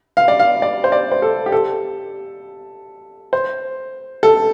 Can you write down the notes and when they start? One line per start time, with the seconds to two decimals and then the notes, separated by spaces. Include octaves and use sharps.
0.17 F5
0.28 D5
0.39 F5
0.62 D5
0.84 C5
0.92 D5
1.12 C5
1.22 A4
1.46 G4
1.52 A4
3.33 C5
4.23 A4